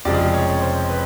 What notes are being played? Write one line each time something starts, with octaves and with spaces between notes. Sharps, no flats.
F1 F2 C#3 F3 G#3 D5
C#5
C5
B4